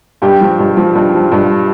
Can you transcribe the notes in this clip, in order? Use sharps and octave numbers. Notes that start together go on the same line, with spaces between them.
G2 G4
F3
G2
F3
G2
F3
G2